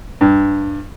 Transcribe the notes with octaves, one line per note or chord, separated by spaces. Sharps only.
G2